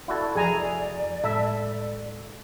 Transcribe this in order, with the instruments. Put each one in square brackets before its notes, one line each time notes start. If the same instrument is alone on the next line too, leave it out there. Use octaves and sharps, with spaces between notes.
[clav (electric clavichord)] E4 F#4 A4 [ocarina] D5
[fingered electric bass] F1 F3 [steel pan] G#4 G#5 A#5
[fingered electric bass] A2 G#3 [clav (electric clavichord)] A4 [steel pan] E5